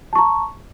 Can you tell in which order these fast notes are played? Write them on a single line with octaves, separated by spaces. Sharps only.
A5 C#6 A#5